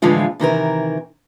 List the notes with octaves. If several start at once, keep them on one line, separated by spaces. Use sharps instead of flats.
A2 D3 E3 F3 G#3 F4
C3 D#3 E3 A#4